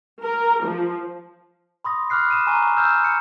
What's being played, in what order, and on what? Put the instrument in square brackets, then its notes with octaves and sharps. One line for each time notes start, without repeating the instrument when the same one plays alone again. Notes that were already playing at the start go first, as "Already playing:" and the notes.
[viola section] A#4
F3
[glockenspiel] B5 C6 D#6 A#6
B5 D6 F6 F#6 C7
D#6 D#7 E7
G#5 A#5 C#6 D#7
E6 F6 G6 E7
C#7